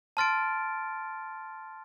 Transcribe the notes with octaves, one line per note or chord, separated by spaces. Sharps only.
A5 C6 F6 A6 D7